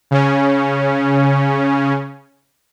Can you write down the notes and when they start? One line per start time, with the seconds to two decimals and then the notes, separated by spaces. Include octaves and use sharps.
0.11 C#3 C#4